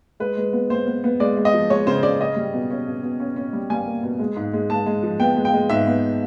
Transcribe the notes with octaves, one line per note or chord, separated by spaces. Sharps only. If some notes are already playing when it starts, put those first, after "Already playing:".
G#3 B4
G#3
B3
B3 C5
B3
B3
G#3 D5
G#3
D#5
F3
G#3 C#5
C#3 C5
C#3 D5
C#4 D#5
G3
B2
C#4
B2
B2
C#4
C#4
G3
G3 G#5
A#3
B2
G#3
G#2
G#3
G#3 A5
G#3
F3
B3 G5
G#3
G5
G#3
G#2 E5
B3